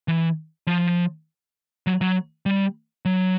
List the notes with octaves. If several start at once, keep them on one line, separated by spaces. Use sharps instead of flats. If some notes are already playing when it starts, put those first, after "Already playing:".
E3
F3
F#3
F#3
G3
F#3